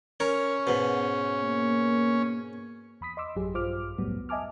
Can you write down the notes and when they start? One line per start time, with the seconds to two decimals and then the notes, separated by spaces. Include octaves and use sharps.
0.20 C#4 A#4 C#5
0.67 G#2 B2
1.43 A#3
3.01 E2 B5 D#6 B6
3.17 D#5 C6 D6 E6
3.36 A1 F#2 F#3 G4 G#4
3.54 A#1 G2 F4 C5 D6 F6
3.98 C2 F2 A2 F#3 G3 B3
4.29 D#5 E5 G#5 A5 D6 F6